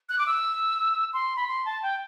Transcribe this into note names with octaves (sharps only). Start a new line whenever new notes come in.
F#6
D6
E6
C6
B5
C6
A5
G5